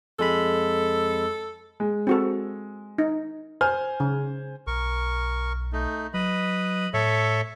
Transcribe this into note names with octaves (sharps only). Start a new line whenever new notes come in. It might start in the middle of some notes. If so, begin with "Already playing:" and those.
F2 G#3 A4 B5
G#3
C4 F#4 A4
D#4
C5 G#5 F6
C#3
B1 A#4 C#6
A3 D#4
F#3 B4 D#5 B5
A2 A4 C#5 E5